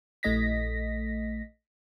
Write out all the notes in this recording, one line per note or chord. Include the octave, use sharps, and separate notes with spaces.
A#1 A3 D#5 A#6 B6